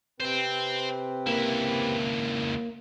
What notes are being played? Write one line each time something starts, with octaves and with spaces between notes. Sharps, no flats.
C3 C4 B4 C5 G5
C#2 A#3 E4